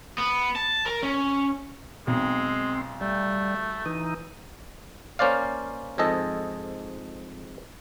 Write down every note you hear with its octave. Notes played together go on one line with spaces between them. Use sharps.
B3
A5
A#4
C#4
B1 G#3 C4
G3 A3
E3 D#4
A#3 C#4 C5 D5 F5
F2 G#2 G#4 A4 D#5